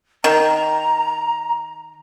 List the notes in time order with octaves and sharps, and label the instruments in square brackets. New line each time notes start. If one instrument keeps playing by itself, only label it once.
[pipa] D#3 [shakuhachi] A#5